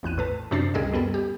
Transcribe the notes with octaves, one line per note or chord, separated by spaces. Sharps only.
A1 E2 F#6 D#7
A2 B4 A5
F#2 C3 D4 A6 C7
C#2 A2 G3 G#4 A#4 D#5
F#2 G3 B3 A4
G4